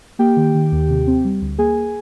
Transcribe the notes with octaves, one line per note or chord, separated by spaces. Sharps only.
A#3 G4 G5
D#3
D#3
D#2
C3
C4
G3
D2
A#3 G#4 G#5